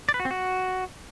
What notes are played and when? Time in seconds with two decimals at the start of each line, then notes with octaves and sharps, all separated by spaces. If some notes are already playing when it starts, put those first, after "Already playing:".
0.09 D5
0.14 B4
0.20 F#4
0.25 C4
0.31 F#4